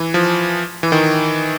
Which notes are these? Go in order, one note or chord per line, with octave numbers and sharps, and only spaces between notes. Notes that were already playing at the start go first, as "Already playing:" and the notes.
Already playing: E3
F3
E3
D#3